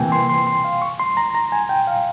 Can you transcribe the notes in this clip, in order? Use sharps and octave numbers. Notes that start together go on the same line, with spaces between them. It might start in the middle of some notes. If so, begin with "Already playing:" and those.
Already playing: C3 E3 A#3 G5 G#5
C6
C6
C6
F5
C#6
C6
A#5
A#5
G#5
G5
F5